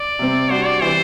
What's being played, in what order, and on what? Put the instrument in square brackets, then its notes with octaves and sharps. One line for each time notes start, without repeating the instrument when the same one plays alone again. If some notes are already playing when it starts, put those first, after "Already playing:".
Already playing: [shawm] D5
[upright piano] C3 G3 C4
[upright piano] G3 D4 F#4 [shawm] C5
[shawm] D5
[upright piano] E3 B3 E4 G4 [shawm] C5